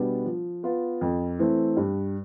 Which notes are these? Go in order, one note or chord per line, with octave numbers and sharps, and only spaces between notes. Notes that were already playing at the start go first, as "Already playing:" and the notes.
Already playing: B2 G3 B3 D4
F3
B3 F4
F2
E3 A3 C4
G2